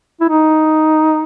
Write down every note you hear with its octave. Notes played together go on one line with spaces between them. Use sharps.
E4
D#4